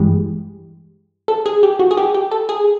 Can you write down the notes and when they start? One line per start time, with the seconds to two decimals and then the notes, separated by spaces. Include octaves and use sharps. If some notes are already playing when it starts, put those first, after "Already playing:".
Already playing: G2 E3 G#3 G4
1.28 A4
1.46 G#4
1.63 G4
1.79 F#4
1.91 G#4
1.97 G4
2.14 G4
2.31 A4
2.49 G#4